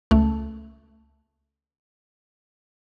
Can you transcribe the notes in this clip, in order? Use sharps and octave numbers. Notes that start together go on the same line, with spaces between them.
C#2 A3